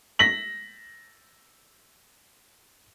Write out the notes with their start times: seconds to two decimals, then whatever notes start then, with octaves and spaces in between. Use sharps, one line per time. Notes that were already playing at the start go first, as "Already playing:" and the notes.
0.19 A#6 B6 F#7